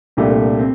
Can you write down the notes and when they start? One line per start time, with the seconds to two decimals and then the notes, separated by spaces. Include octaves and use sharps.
0.17 C2 A#2 A3 D4 G4
0.59 C4